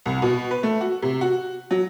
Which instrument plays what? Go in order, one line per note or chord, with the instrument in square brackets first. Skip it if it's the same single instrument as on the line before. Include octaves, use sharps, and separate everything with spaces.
[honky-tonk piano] C2
B2
B4
A3
F#4
C3
F#4
F#3